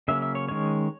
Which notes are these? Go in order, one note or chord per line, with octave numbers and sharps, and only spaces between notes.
C#3 F#3 A#3 C#4 E5
E5
C#5
D#3 G#3 C#4 C#5